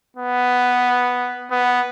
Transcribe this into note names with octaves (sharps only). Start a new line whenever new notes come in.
B3
B3